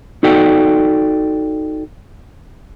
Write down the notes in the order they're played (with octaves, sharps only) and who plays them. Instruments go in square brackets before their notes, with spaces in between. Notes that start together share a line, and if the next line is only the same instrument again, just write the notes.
[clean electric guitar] D#4 F#4 A4 D5 G5